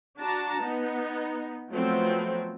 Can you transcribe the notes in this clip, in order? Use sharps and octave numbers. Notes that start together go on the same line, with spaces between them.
D4 F#4 A5 A#5
B3 D#4
F3 F#3 A3 B3 C4